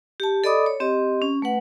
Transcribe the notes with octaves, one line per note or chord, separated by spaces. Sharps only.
G4 A5
A4 D5 D#5 B5 D6 D#6
C#5
C4 G4 D#5
C#4
A3 B4 F#5